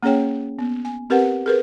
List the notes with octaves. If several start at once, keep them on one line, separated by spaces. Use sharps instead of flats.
A#3 C#4 G#4 C#5 G5
B3
G#5
C4 G4 A#4 B4 F#5
G#4 A#4 B4